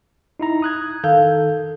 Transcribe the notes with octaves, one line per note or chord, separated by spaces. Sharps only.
D#4 E4 A#5
D#6 F#6 G#6
D#3 A4 F5 G6